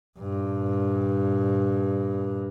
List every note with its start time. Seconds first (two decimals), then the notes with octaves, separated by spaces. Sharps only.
0.19 G2 A#2